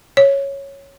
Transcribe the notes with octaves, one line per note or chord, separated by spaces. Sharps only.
C#5